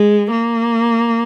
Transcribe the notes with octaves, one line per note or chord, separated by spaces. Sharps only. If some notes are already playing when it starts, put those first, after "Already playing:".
Already playing: G#3
A#3